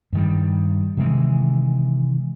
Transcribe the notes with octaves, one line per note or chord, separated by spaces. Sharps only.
G2 D#3 G3
C3 D#3 E3 G#3